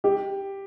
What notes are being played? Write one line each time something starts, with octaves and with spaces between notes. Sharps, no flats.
G4